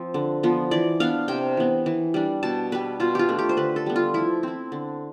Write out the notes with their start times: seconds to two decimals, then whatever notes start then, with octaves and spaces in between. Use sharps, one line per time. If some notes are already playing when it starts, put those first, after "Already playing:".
Already playing: F3 C4
0.14 D3
0.43 F3 B3
0.71 E3 D5
1.00 B3 D4 F5
1.28 C3 G5
1.57 E3 B3
1.86 E3
2.14 G3 D4
2.43 B2 A5
2.72 G3 B3 B4
3.00 B2 F4
3.15 F4 G4
3.29 A3 D4
3.39 G4
3.49 C5
3.57 D3 B4
3.76 A4
3.86 G3 B3
3.96 F4
4.14 F3 E4
4.43 C4 E4
4.72 D3